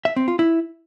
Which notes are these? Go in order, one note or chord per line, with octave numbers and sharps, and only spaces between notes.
E5
C4
F4
E4